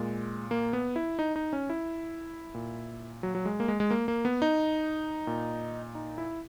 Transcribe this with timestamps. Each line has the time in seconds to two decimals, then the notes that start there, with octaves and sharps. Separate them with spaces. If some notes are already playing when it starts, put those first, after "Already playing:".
Already playing: A#2 G#3
0.51 A#3
0.73 B3
0.96 E4
1.19 D#4
1.36 D#4
1.53 C#4
1.70 E4
2.54 A#2
3.23 F#3
3.35 F#3
3.46 G#3
3.60 A#3
3.68 G#3
3.80 G#3
3.91 A#3
4.08 A#3
4.25 B3
4.42 D#4
5.27 A#2
5.95 D#4
6.18 E4